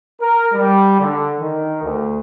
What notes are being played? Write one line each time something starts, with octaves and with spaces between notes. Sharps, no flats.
A#4
G3
D3
D#3
D2